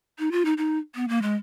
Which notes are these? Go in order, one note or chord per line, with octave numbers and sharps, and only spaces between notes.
D#4
F4
D#4
D#4
B3
A#3
G#3